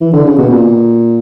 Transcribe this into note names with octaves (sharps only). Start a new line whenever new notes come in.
E3
D3
C#3
B2
A#2